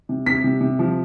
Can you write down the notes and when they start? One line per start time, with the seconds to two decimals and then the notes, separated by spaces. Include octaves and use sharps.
0.09 C3
0.26 C3 B6
0.44 C3
0.61 C3
0.79 F3